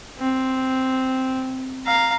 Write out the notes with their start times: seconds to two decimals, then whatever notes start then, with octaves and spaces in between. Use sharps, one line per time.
0.19 C4
1.85 F5 A#5